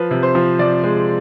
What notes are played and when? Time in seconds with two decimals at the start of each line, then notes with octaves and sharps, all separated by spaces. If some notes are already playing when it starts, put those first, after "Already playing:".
Already playing: F3 B4
0.11 C3
0.23 C5
0.35 F3
0.59 C3 D5
0.84 G#3